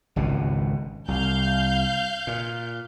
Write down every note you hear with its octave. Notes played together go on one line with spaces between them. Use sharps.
G#1 C#2 B2
C2 F5 G6
A#2